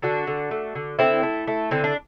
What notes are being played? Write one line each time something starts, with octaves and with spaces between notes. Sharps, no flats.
D3 D4 F#4
D3
A3
D3
D3 C4 E4
A3
A3
D3 C4
D4